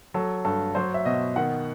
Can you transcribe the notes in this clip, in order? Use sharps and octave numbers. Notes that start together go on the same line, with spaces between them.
F#3 A4
G2 A4
F#3 C5
E5
B2 D#5
D#3 F#5